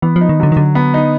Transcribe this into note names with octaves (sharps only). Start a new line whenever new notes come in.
E3 B3
F3
D#4
D#3
D3 F#3
D#3
D3 F#3
B3
D#4